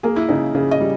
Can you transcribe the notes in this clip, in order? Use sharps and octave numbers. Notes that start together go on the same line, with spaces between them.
A#3 G#4
E4
C#3 D#4
C#3 G#4
D#5
G3